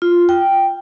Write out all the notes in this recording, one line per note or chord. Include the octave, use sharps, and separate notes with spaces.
F4
G5